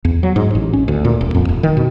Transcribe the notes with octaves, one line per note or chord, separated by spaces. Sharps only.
E2
F#3
G#2
A1
C#4
D2
A#2
D#1
F2
D#1
D#3
B2